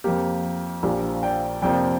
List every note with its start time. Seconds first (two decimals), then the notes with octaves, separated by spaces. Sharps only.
0.04 F2 F3 A#3 G4
0.83 A#1 A#2 F3 A#3 G4 C5
1.23 D5 G5
1.62 F2 C3 F3 A#3 D5 G5